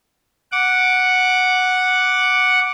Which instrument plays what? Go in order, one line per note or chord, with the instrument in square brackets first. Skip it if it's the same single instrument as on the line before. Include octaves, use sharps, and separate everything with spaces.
[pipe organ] F#5 D6